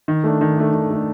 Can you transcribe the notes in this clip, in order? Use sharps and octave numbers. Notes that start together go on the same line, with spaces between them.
D#3
A3 D4
D#3
A3 D4
D#3
A3 D4